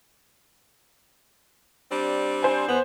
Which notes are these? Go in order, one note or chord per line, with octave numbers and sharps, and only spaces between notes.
G3 C4 D4
C5 G#5
E2 B3